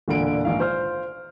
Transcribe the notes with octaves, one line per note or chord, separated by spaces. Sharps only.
E1 A#2 D3 F4 D7
A#1 G#2 D#3 F5
F4 C5 F6